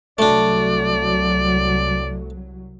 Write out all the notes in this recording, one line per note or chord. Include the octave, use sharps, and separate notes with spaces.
C2 F#3 A3 D4 D5